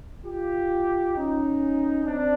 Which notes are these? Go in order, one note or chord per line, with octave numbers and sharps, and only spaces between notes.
F4 G4
C#4 D#4
C4 D4